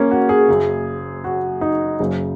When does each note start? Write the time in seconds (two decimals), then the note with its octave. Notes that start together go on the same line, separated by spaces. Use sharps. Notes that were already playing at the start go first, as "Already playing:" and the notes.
Already playing: A#3 C#4
0.11 F#4
0.29 G#4
0.48 F#1 F#2 C#3
1.24 F#4
1.61 D#4
1.99 F#1 F#2 C#3